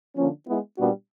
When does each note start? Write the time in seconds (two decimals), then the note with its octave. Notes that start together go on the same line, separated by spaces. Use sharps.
0.15 D3 F3 A#3 C#4
0.46 G#3 B3 E4
0.77 A#2 G3 B3 D4 F#4